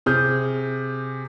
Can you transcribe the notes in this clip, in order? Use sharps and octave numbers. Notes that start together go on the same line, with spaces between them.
C3 G#4 D#6 F6 G6